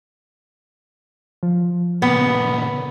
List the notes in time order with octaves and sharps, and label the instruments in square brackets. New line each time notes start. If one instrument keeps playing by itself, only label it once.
[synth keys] F3
[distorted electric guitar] A#2 C#3 [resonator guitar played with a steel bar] B3